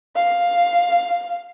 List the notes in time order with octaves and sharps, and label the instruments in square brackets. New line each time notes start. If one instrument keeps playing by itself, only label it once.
[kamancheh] F5